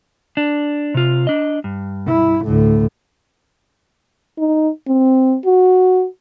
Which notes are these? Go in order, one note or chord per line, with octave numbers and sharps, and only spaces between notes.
D4
C3 F4
D4 D#5
G2
E4
D2 A2
D#4
C4
F#4